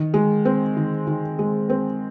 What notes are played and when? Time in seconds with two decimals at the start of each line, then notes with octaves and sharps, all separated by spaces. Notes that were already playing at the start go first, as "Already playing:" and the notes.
Already playing: D#3
0.14 G#3
0.45 C4
0.77 D#3
1.07 D#3
1.39 G#3
1.70 C4